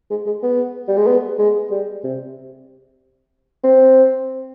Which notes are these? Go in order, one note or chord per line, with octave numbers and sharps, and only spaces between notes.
G#3
G#3
B3
G3
G#3
B3
G#3
G3
C3
C4